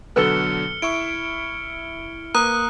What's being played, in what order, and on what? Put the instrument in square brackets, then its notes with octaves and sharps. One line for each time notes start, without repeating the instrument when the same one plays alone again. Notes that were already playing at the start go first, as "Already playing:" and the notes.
[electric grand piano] B2 D3 F#3 [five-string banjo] A4 B4 [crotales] F6 C#7 G7
[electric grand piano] E4 E5 C#6 [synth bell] D7
[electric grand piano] A#3 [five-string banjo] B4 [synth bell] A#5 D#6 [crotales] F#6